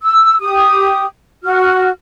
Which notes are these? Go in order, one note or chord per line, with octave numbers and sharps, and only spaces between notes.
E6
G4 D#6
F#4 F6